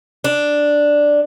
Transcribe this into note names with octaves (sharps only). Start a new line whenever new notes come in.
D4